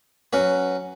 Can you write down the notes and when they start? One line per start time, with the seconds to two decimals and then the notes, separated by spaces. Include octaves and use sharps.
0.33 F#3 C#4 F#4 B4